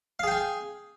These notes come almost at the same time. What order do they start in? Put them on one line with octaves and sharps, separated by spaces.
F5 G#4 G5 G#5